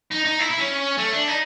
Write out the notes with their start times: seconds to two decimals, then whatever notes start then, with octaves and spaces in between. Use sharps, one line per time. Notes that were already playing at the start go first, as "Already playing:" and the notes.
0.11 D#4
0.25 D#4
0.39 E4
0.50 E4
0.59 C#4
0.98 A3
1.12 D4
1.28 D#4